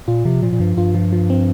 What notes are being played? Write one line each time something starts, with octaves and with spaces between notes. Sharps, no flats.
A#2 F4
C3 F3
A#2 F3
A#2
G2 F3
G2 F4
F3
F3
C4